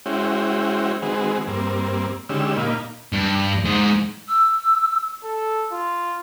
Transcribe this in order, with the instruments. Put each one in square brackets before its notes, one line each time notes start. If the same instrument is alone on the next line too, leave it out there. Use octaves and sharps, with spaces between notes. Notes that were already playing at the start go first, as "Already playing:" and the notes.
[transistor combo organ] G#3 C#4 E4 F#4 C5 G5
D#3 G#3 C4 F#4 G#4 B4
G2 A#3 C4
D3 D#3 G#3 C#4 G4 E6
A#2 A#3 D#4 F5 B5
[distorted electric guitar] G2
G#2 G#4
[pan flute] E6
[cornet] A4
F4